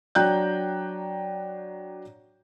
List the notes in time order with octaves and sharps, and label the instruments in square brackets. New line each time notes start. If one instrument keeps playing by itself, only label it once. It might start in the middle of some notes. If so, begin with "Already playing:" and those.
[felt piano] F#3 D4 G5 A#5 F#6 G6